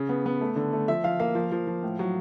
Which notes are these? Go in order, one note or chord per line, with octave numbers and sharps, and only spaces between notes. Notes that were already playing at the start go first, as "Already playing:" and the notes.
Already playing: C#3
B3
B3
A3
D3
A3
F3 E5
F3 F5
A#3 F5
F3
F3
F3
A2
F#3